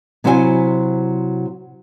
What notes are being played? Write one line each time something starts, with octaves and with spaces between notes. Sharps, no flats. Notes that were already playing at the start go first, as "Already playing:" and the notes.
C3 F#3 E4 C5 D#5 G#5